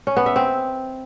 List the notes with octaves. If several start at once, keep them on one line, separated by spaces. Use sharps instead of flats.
C#4
B3
E5
C4